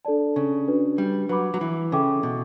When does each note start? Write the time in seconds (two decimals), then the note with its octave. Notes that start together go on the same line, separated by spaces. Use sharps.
0.05 D4 A4 D5 A5
0.36 C#3
0.68 D4 F#4 B4
0.98 G3
1.29 F#3 B4 F#5 B5 D6
1.54 F#3
1.61 E3
1.92 C#3 A4 E5 G5 D6
2.23 B2